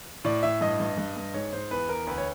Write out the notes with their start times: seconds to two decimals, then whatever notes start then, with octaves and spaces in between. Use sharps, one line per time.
0.25 A2 D5
0.43 A2 E5
0.61 G2 D#5
0.80 G2
0.97 G2
1.16 G2
1.34 G#2 C#5
1.52 G#2 C5
1.71 E2 B4
1.89 E2 A#4
2.07 D2 B4
2.18 C#5